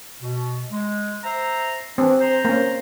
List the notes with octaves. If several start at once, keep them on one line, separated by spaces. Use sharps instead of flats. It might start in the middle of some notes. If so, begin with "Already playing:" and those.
B2
G#3
C5 E5 A#5
E3 C4 D4
C5 A#5
A#3 C#4